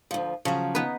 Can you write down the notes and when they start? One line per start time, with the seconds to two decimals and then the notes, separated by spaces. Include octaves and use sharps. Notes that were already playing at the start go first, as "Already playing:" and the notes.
0.11 D2 F3
0.45 C#3 F3 F#3
0.75 B3 D#4 B4